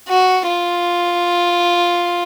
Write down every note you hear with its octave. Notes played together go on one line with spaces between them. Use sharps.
F#4
F4